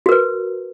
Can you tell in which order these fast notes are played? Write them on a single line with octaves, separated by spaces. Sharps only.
F#4 A#4 B4